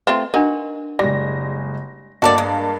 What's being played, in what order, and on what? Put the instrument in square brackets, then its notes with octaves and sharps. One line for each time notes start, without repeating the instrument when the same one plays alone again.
[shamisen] A3 C4 F4 [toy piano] B4
[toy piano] D4 A#4 [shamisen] D#4 F#4
[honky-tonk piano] F#1 G#3 A#6 [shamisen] G3
[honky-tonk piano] G2 A#3 [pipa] F#4 A4 D5 [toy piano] D#5
[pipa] G#3